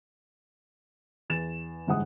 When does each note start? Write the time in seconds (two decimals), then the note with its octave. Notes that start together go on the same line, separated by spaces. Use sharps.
1.30 E2 A6 E7
1.87 G1 G#2 E3 F#5 D#6